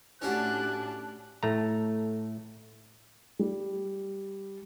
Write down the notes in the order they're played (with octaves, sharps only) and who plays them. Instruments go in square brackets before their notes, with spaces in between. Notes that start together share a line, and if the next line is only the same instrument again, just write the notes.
[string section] A2 D4 [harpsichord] C#4 F#4 [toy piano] E4 G4 F#5 [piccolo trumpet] F#6
[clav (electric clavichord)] A2 A3 A#5
[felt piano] G3